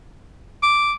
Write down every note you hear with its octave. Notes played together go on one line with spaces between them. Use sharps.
D6